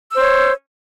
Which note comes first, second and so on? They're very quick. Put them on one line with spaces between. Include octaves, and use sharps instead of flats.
E6 C5 C#5